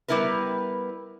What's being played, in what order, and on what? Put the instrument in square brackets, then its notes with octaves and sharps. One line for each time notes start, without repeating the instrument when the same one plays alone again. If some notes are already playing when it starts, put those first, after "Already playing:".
[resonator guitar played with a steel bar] G3 B3 E4 A#4 B4